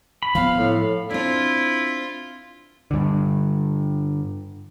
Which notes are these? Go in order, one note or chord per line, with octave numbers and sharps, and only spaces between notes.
B5
F3 B3 F5
A2
C4 D4 E4 F4
G2 D3